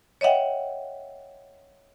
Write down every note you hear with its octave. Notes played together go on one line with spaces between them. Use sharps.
C#5 D#5 E5 F#5 G5